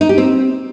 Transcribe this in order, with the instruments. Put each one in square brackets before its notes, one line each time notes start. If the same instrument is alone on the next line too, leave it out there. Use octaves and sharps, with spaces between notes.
[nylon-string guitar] D#4
G4
C4